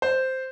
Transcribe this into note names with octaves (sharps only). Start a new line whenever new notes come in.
C5